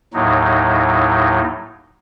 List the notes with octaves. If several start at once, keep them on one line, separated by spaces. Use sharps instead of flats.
D#2 A2 F#3 D#4